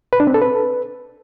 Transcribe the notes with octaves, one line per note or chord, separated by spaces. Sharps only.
B4
D4
C4
A4
B4